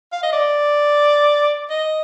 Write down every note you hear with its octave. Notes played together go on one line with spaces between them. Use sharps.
F5
D#5
D5
D#5